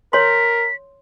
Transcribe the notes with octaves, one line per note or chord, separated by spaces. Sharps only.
A#4 C#5 C6 B6